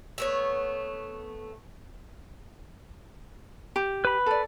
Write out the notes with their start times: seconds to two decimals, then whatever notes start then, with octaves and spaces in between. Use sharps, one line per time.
0.18 A3 B3 C#5
3.76 G4
4.05 B4 B5
4.26 A4 D5